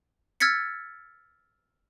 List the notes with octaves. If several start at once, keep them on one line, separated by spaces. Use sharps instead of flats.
E6 F6 G#6 A6 B6 C#7